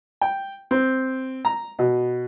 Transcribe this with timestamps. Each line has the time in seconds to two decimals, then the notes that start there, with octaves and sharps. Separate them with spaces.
0.21 G5
0.71 C4
1.45 A#5
1.79 B2